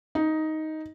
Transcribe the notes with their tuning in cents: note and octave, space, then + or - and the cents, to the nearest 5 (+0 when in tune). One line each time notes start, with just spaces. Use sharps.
D#4 +10